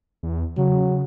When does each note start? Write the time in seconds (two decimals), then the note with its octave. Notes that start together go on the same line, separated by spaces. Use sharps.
0.23 E2
0.57 C#3 F#3